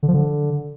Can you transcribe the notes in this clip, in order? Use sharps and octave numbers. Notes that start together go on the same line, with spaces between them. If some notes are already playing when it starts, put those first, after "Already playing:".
D3
F3
D3